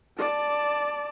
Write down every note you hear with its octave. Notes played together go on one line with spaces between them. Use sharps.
D5 A5